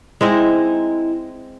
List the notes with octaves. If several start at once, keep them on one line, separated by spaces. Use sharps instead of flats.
G#3 C4 D#4 E4 D#5